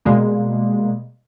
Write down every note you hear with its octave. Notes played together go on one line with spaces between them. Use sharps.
B2 G3 G#3 A#3